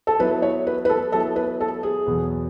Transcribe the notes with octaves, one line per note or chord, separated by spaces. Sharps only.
A4
F#3 B3 E4 B4
C#5
B4
B4
A4
F#3 B3 E4 A4
B4
A4
G#4
E2 B2 F#3 B3